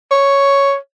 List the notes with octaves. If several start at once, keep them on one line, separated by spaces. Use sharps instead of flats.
C#5